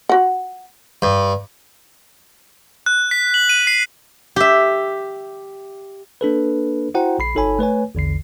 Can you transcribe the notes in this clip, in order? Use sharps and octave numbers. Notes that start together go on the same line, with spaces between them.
F#4 F#5
G2
F#6
B6
F#7
D#7
C7
G4 E5
A#3 D4 A4 B4
E4 F#4 C5 F#5 G5 A#5
A#1 B5 C7
G1 D#4 A4 C#5 G#5 B5
A3 B4 C#5 G#5
A#1 E2 D3 C7